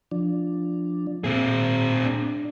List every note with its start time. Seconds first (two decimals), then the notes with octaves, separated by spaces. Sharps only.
0.11 F3 D4
1.24 A#2 C4 G#4
2.05 D4